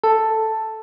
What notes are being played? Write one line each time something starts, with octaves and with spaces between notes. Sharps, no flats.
A4